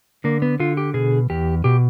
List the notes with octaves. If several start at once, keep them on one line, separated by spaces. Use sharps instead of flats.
D3 A#3
B3
D3 F4
G4
B2 G#4
E2 G4
B2 G4